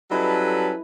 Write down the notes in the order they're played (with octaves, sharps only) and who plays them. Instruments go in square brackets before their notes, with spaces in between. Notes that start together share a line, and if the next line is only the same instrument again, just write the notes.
[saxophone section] F#3 G3 C#4 [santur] E4 D#5 [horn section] A4 B4